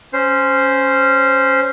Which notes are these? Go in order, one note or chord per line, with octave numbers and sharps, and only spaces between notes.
C#4 C5